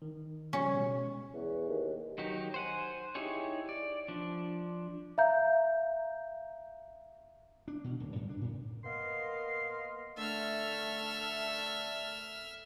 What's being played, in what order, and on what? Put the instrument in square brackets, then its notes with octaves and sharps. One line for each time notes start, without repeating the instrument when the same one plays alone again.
[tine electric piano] D#3
[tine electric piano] C#3 F3 G3 [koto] C#4
[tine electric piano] B2 G#3
[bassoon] E2
D#2
[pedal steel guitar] D#3 F#3 D#4 G4
C5 F#5 G#5
D#4 E4 G4 G#4 C#5
D5
F3 D4
[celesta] E5 F5 A#5 G6
[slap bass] D4
B2
D1
F#2
D4
A2
[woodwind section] A#3 B3 A#4 D#5 F5 C6
[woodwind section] D3 A3 A4 [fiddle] E5 F6